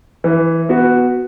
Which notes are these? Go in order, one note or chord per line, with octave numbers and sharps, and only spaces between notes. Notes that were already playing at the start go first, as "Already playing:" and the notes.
E3
B3 F#4